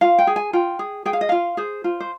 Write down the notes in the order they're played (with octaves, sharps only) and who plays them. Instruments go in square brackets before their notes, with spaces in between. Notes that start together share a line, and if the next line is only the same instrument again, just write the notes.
[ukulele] F4 F5
G5
G#4
G#5
F4 G5
G#4
G#4 G5
F5
D#5
F4 F5
G#4 C5
F4
C5